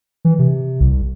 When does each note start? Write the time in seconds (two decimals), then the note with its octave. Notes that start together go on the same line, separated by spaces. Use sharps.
0.25 E3
0.39 C3
0.80 C2